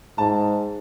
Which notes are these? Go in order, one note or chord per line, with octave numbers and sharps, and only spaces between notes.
G#2 A5